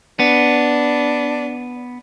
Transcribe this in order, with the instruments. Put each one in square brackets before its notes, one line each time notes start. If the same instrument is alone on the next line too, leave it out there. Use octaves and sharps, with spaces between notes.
[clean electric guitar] B3 [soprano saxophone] D4